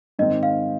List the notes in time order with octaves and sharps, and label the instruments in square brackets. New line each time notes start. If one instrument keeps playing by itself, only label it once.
[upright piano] G#2 D#3 C4 [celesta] D#5
[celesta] F5